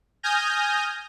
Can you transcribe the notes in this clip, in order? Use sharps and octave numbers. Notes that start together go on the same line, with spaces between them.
G#5 D#6 F6 G6 A#6